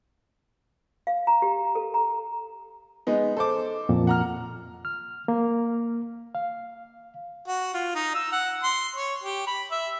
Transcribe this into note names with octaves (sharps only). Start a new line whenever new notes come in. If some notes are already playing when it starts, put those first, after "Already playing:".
F5
A#5
G4
A4
A#5
G#3 B3 D#4
A4 C5 D6
F2 A#2
F#5 A#5 F6
F6
A#3
F5
F#4
F4
D#4
E6
F#5
C6
C#5
G4
B5
E5